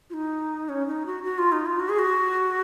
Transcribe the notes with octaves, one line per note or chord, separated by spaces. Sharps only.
F4
D#4
C#4
D#4
F#4
F#4
F4
D#4
F4
F#4
G#4
F#4